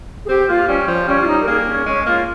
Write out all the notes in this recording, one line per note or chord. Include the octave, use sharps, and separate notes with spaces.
G#4
C4 G4
A#3 F4
G3 C#4
F3
G3 C#4
F4
D#4
A#4
A#3 G#4
C#4
G#3 C#4
A#3 F4